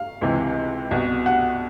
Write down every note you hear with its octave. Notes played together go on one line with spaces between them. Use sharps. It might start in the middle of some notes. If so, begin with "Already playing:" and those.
Already playing: F5
C#2 C3 E3
C2 B2
F#5